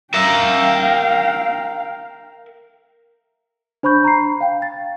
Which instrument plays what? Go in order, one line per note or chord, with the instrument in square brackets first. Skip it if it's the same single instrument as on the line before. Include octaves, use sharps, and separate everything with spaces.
[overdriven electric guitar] A#4 E5 [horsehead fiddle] F5 G5
[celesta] D4 C5 B5 C#6 G6
A#5 B5 C7
F5 G5
A6